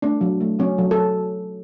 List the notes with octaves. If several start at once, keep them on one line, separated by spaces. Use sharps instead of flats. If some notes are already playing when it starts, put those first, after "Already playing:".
A3 D4
F#3
A3
F#3 C#4
F#3 A4
A4